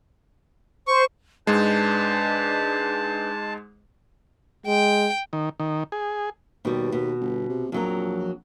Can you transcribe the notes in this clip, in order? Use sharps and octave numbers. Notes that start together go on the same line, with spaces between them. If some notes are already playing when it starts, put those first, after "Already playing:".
C5 C#6
G#2 G#3 D4 B4 A5 G6
G#3 G5
D#3
D#3
G#4
D#2 B2 G3
B2
G1
C3
A#1 F2 F#3 A#4